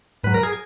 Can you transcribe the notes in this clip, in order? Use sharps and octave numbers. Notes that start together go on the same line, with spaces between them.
G#2 F#3 B4
A#4
G#4